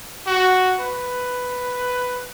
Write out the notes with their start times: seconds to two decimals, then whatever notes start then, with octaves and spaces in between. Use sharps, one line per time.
0.27 F#4
0.80 B4